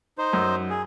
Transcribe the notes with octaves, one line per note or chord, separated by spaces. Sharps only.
D#4 C5
F#2
G#4